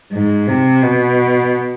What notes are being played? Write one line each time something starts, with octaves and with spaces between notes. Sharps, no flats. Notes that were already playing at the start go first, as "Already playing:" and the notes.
G#2
C3
B2